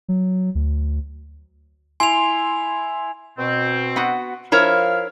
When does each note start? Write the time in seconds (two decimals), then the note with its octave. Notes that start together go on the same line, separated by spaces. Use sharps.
0.08 F#3
0.55 D2
2.00 E4 G#5 C6 F7
3.39 B2 C4
3.96 B3 F#4
4.52 F3 E4 A#4 C#5 F5 F6